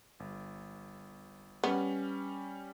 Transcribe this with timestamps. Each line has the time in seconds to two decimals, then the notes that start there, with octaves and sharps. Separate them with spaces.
0.20 G1
1.64 G3 B3 C#4